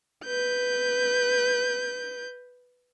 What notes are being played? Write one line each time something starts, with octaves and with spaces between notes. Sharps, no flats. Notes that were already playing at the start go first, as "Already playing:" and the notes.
B4 G6